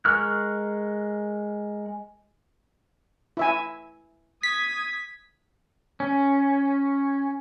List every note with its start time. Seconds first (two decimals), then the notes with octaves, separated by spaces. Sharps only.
0.05 G#3 A#4 C#6 F6 F#6
3.37 E4 E5 G#5
4.43 D#6 G#6 B6
6.00 C#4